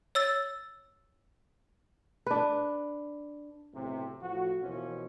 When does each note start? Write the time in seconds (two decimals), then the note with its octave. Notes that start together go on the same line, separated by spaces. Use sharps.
0.15 C#5 E6 A6
2.26 D4 B4
3.73 B1 A2 C3
4.20 A2 F3 F#4
4.62 D#2 B2 E3 F3 C#4